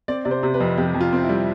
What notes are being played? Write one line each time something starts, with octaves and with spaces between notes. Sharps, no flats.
C4 D5
C3 D5
C5
C3
B4
F2
F2 G4
F2
F4
C4
E4
G3